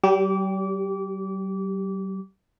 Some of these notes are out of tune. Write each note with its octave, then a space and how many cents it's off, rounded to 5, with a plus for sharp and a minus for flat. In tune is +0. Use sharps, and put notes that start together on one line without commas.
G3 -45 G4 +0 D6 -25